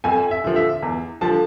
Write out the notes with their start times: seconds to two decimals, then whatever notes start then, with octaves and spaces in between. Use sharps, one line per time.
0.04 F2 G#5
0.31 E5
0.44 D3 F3
0.56 E5
0.82 E2
1.21 D3 F3 A5